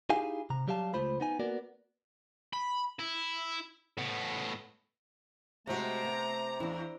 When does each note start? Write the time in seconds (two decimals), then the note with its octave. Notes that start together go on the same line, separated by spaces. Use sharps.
0.10 D#4 E4 G4 G#4 F5 G#5
0.50 C3 A#5
0.67 F#3 G3 G4 F5 A5
0.94 C#2 A3 F4 C5 B5
1.20 B3 D#4 G#5
1.39 A#3 B3 F#4 A#4 D5
2.53 B5
2.99 E4
3.97 A2 B3
5.67 C3 G#3 A3 C4 F#4 A#5
6.05 B3
6.60 E2 D4 E4